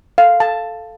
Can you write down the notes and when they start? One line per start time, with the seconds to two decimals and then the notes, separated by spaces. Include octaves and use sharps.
0.18 A4 F5
0.40 A4 A5